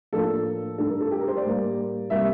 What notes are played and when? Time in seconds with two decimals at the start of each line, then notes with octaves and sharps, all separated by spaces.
0.13 A2 F3 A#3 D4 A4
0.78 G2 D3 A3 D4 A4
0.89 A#4
1.01 A4
1.11 G4
1.20 A#4
1.28 C5
1.36 D5
1.44 A2 G3 A#3
2.10 C3 G3 A#3 E5